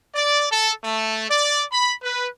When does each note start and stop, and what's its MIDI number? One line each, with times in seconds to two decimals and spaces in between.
0.15 0.47 74
0.51 0.71 69
0.84 1.26 57
1.30 1.62 74
1.72 1.92 83
2.02 2.27 71